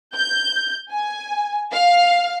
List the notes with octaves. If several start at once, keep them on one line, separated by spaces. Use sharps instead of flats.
G6
G#5
F5